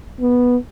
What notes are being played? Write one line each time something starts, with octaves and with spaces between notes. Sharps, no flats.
B3